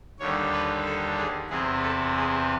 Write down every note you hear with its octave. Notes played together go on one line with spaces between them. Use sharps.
D#2 D3 G3 C#5
B4
A4
G#4
E2 C3 E3 G#4
A4
G#4